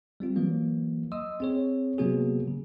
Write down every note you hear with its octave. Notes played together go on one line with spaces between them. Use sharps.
G3 C4 F4
E3 F#3 A#3
D#5 C6 D#6 E6
C4 G#4 C#5
C3 F#3 A#3 B3 F#4 G#4
C#3